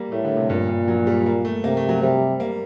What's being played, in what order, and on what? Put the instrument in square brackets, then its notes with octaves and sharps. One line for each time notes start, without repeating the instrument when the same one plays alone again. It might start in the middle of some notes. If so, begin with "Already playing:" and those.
Already playing: [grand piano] G3 A#3
[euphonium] A2 [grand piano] A3
[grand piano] D3
C3
[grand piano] G2 [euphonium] A#2
[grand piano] G2
F#3
G3
A#3
A3
[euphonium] C3 [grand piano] A#3
[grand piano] A3
F#3
[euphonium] C3 [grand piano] G3
[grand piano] A#3